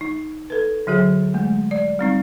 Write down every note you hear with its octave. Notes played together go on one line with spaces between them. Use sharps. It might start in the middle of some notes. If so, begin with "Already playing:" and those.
D#4
A4 B4
D3 F#3 F#4 G#4
G#3 A3
D5
G3 C4 D#4